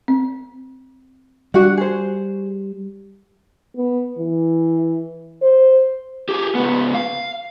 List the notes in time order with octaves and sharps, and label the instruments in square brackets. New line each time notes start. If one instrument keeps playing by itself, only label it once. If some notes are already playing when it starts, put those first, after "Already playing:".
[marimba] C4
[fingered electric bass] G3 [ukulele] D4 F#4 F#5
[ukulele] G#4 C5
[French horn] B3
E3
C5
[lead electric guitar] G4 G#4
C#2 B3
F5